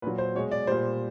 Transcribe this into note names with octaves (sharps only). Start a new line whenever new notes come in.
A#2 F#3 B4
C5
B2 G#3 C#5
D5
A#2 G3 C5